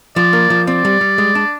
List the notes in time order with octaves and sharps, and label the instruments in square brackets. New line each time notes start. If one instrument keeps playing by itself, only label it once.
[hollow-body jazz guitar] F3 [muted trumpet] D5
[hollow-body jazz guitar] A#3
F3
[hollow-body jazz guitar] C4 [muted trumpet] D5
[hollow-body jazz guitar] G3
G3
G#3
D4